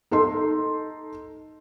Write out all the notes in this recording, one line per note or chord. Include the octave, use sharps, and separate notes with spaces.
D#4 A4 A5 C6